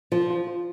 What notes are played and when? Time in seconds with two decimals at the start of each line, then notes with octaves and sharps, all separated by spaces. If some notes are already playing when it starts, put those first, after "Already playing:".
0.12 F3 F4
0.30 F4
0.48 F4